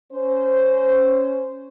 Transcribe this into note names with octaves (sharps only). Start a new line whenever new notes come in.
C#4 C5